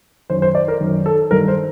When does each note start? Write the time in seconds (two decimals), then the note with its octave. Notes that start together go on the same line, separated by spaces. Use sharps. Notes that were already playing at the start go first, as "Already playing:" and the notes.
0.30 F#2 D#3 C5
0.42 C5
0.55 D5
0.68 A#4
0.80 F#2 D#3
1.06 A4
1.31 G2 D#3 A#4
1.48 C5